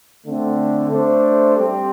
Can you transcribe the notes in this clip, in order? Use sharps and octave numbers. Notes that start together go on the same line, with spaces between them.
D3 A3 C4
A3 D4 A4 C5
G3 C4 G4